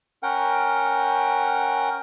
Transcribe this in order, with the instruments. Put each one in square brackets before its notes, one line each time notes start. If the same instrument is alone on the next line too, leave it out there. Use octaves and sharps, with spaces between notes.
[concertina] C#4 A#4 F#5 G5